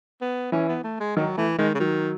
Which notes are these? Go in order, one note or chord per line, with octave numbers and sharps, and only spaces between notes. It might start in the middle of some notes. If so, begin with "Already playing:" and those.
B3
E3 C#4
B3
A3
G#3
D#3 F#3
E3 A3
D#3 G#3
C#3
D#3 F#3